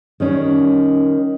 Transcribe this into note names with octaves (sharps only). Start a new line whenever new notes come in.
D#3 G3 C#4